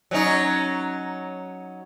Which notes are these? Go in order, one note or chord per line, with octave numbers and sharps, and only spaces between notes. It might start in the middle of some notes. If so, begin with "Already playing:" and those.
F#3 C#4 D#4